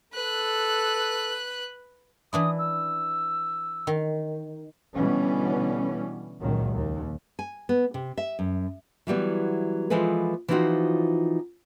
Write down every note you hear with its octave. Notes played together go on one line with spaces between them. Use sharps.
A4 B4 F#6
E3 D4 E4 D#6
E6
D#3
B2 D3 E3 G3 B3 C#4
C#2 F#2 A#2 D#3
D#2
G#5
B3
C3
E5
F#2
E3 F#3 G3 B3
E3 F3 G#3 G#4 A4 B4
E3 F3 C4 D#4 F4 F#4